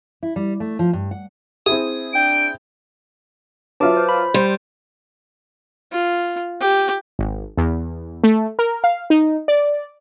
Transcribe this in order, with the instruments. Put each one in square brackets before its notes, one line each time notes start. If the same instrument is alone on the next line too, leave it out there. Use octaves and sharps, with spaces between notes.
[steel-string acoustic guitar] E4
G3
A3
F3
G2
F#5
[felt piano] C4 E4 G#4 [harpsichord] D#6
[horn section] D4 G5 [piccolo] D7
[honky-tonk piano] F#3 F4 E5 [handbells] B4 A5 D6
[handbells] C5
B5
[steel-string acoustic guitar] G3 [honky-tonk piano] C5
[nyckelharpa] F4
G4
[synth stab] G#1
E2
A3
A#4
F5
D#4
D5